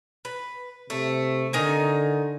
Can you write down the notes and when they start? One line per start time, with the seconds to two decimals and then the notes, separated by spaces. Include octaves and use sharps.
0.25 B4
0.90 C3 A3
1.53 D3 D#3 D#4 G#5